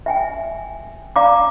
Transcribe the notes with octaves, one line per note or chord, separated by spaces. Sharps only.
E5 G5 G#5
D5 F5 A#5 D6